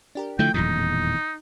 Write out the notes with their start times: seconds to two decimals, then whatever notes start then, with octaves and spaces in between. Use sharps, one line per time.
0.15 D4 G4 A#4
0.39 D3 F3 A3 E4 G5
0.54 D#1 E2 A2 F#3 D#4